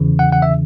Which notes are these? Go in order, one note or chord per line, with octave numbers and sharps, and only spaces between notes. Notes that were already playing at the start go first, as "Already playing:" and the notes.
Already playing: E2 C#3 E3
F#5
F#5
E5